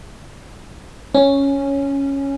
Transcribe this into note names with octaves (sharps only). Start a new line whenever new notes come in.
C#4